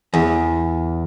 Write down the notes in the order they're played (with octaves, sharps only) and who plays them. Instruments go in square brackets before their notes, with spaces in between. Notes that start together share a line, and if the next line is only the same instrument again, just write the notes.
[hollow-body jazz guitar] E2